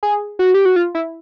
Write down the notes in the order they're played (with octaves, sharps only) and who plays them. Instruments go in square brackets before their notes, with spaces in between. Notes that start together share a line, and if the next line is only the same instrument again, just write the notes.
[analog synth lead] G#4
F#4
G4
F#4
F4
E4